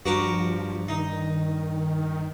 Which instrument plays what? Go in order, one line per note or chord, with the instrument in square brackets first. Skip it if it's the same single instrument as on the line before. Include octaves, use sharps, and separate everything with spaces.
[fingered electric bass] G2 [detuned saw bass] F3 [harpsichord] F#4 G4 A#4
[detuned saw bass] D#3 [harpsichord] D#4